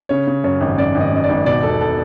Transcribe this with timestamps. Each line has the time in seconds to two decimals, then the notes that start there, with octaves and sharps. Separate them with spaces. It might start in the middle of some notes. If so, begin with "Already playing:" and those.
0.09 C#3 C#5
0.27 C#3
0.44 F#2 C#5
0.61 G#1
0.78 F#2 D5
0.95 G#1
1.00 D#5
1.13 F#2 D#5
1.24 D5
1.29 G#1
1.46 B2 D5
1.63 E1 A4
1.81 A4